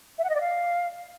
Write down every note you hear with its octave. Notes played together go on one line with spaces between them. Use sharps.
E5
F#5
D#5
D5
F5